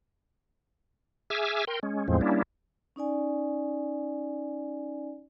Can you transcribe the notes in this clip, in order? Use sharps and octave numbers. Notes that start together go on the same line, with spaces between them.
G#4 E5 G#5 D6 E6 F6
A#4 G5 C6
G#3 C#4
E2 A2 F3 G#3 C4
G3 A#3 C#4 D4 E4
C#4 D#4 D5 G#5